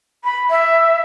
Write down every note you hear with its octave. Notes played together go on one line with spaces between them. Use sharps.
B5
E5